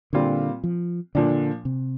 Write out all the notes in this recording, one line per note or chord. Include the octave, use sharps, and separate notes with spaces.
A#2 D3 G3 C4 F4
F3
A#2 D3 F3 D4
C3